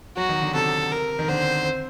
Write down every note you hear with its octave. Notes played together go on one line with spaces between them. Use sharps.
F#3 F#4
D#3
D3
C3 A4
A#4
D#3
D3 C5
C4
C4